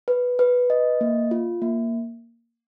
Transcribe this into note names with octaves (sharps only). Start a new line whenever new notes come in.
B4
B4
D#5
A#3
F4
A#3